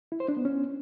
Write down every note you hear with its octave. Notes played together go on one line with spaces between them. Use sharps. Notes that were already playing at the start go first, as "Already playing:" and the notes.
E4
C5
D4
B3
C#4